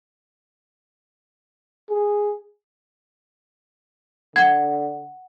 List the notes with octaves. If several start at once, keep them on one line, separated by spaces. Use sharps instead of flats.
G#4
D3 F#5 G#6